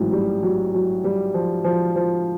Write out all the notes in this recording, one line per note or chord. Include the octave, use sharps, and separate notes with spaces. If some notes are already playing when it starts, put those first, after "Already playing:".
Already playing: A1 G#2 E3 F#3
G3
F#3
F#3
G3
F3
F3
F3